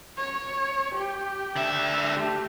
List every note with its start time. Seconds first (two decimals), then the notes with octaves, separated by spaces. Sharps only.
0.17 C#5
0.94 G4 G5
1.56 D3 E5
2.13 A3 G4